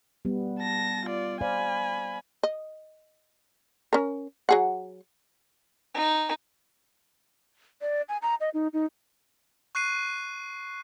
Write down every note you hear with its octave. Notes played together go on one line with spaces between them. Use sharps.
G3 B3
A5 A#6
F4 D5
C5 D5 F5 G#5 B5
D#5
C#4 A#4
F#3 G#4 F#5
D#4
D5
G#5
A#5
D#5
D#4
D#4
C#6 F#6 C7 D#7